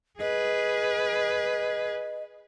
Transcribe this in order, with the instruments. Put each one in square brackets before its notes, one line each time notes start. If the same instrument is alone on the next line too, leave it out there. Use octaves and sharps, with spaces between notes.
[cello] G#4 B4 [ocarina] D#5